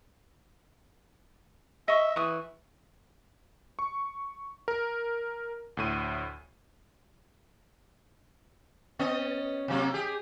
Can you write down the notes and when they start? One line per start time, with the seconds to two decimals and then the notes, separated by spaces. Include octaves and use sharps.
1.88 D#5 E5 C#6
2.16 E3 C#6 D#6
3.79 C#6
4.68 A#4
5.77 D2 A2 D#7
8.99 B3 C#4 D#5
9.68 C3 F#3 A#3
9.94 G4 G#4